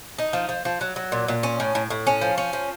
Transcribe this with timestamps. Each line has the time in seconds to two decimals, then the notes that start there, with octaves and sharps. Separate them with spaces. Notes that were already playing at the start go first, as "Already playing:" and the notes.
0.18 D#4
0.33 F3
0.49 F3
0.65 F3
0.81 F#3
0.96 F#3
1.12 A#2
1.28 A#2
1.43 C#4
1.60 A2
1.75 A2
1.90 A2
2.07 C#4
2.21 F3
2.38 C#4
2.53 F3